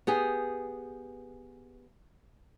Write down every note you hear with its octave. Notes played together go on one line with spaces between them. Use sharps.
B3 G4 G#4